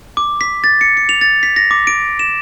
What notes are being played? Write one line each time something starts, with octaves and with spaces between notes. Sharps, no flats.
D6
B6
A6
C#7
C#7
F7
A6
B6
A#6
D6
D7
E7